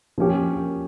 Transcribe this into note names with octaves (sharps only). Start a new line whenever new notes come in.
F3 A#3 C#4 G4